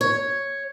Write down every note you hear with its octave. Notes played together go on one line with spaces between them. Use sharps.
C#5